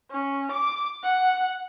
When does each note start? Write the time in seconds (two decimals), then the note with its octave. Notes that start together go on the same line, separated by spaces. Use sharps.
0.11 C#4
0.52 D6
1.03 F#5